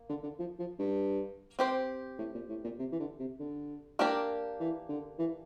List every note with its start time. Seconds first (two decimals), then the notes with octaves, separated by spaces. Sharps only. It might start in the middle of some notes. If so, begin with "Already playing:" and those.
Already playing: A#3
0.09 D3
0.23 D3
0.39 F3
0.59 F3
0.79 G2
1.59 C4 G4 C5
2.18 A2
2.34 A#2
2.49 A2
2.64 A#2
2.78 C3
2.92 E3
2.99 D3
3.19 C3
3.39 D3
3.99 A#3 D4 G4 A#4 D5
4.60 E3
4.88 D3
5.18 E3